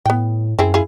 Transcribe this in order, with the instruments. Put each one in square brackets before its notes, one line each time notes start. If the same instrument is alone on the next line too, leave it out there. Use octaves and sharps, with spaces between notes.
[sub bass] A2 [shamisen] B3 G5
[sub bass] F#2 [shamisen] C4 E4 G#4
[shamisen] E4 F4 G#4